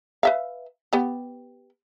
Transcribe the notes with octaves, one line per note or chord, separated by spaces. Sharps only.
B4 E5 F5
B3 G4